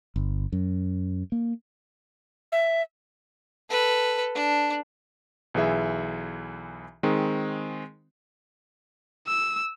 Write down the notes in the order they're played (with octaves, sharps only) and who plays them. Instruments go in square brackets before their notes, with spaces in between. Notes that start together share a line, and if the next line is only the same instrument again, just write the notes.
[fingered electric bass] G1
F#2
A#3
[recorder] E5
[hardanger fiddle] A4 B4
D4
[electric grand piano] B1 E3 G#4 E5
D#3 G#3 C4
[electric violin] E6